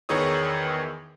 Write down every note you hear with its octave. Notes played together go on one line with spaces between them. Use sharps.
E2 D#3 E3 G#4 C#5 D#6